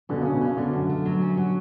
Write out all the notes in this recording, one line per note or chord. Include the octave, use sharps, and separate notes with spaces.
B2 D3 C#4
C#3 C#4
B2
C#3 C#4
B2 D3 A3
F#2
A3
F#3
C#4
F#3